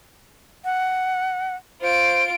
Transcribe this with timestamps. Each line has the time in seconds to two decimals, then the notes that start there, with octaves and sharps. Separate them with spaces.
0.65 F#5
1.81 F4 C5 D7